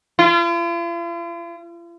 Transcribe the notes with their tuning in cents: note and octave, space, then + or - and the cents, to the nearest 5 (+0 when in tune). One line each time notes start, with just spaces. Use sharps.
F4 -45